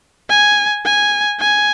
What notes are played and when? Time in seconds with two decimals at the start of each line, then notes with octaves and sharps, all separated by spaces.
0.29 G#5
0.85 G#5
1.40 G#5